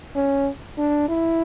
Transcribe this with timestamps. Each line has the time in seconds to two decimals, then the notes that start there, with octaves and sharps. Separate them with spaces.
0.16 C#4
0.78 D4
1.09 E4